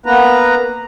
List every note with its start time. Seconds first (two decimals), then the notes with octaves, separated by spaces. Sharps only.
0.06 A#3 B3 B4 A#5